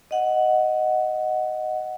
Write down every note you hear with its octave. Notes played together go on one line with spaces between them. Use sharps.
D#5 F#5